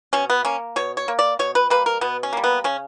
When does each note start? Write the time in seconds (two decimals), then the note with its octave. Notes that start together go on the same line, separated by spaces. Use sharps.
0.13 B2 C#4
0.30 B3
0.45 A#3 C#4
0.76 B2 C#5
0.97 C#5
1.08 A#3
1.19 D5
1.39 B2 C#5
1.55 B4
1.70 G3 A#3 B4
1.86 A#4
2.01 B2 B3
2.23 C#4
2.33 G3 A#3
2.44 B3
2.64 C#3 C#4